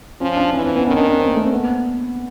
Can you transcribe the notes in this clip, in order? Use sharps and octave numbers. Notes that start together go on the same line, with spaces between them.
F3 C#4
D4
E3 C#4
C4
B3
D#3 C#4
D4
D4
C4
A#3
A3
C4
B3